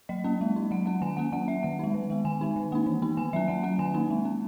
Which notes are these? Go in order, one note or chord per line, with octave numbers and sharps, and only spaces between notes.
F#3 D#5
A#3 C#4
G#3
D#4
F#3 F#5
C#4 F#5
D#3 G#5
A#3 C#4 F#5
F#3 F#5
C#4 E5
D#3 F#5
G#3 D#4
D#3
G#3 B3
D#3 G#5
G#3 D#4
D#3
A#3 D#4
E3
B3 D#4
D#3 G#5
F#3 C#4 E5
F#3 F#5
C#4 F#5
D#3 G#5
A#3 D#4
G#3
C#4